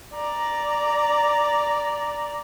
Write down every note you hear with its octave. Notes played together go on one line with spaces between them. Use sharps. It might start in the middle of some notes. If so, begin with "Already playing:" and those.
D5 A#5